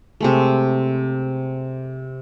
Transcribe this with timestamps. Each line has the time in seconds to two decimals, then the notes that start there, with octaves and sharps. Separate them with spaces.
0.21 C3 G#3 A3